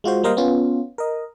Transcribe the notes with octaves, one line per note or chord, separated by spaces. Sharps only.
G#3 F4 F#4 C5
G3 A#3 A#4 C5 D#5 F5
B3 C#4 F4
A#4 D#5